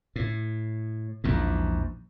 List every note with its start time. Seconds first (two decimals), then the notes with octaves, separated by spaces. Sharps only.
0.16 A2
1.24 A#1 E2 G#2